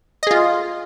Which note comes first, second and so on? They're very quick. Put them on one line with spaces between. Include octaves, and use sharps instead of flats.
D#5 G#4 F4